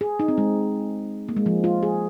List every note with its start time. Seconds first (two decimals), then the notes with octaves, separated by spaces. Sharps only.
0.01 G#4
0.20 D#4
0.28 C4
0.38 G#3
1.29 A#3
1.37 G#3
1.46 F3
1.64 F4
1.83 G#4